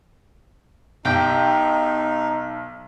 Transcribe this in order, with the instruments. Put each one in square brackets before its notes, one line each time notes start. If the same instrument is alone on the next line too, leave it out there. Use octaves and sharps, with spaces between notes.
[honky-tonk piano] B1 [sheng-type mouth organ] D#4 [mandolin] G4 G5